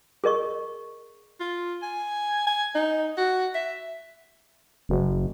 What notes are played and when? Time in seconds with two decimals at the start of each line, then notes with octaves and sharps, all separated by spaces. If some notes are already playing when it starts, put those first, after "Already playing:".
0.24 G#4 A#4 D#5 C#6
1.40 F4
1.83 G#5
2.47 G#5
2.75 D#4
3.18 F#4
3.55 E5
4.89 F#1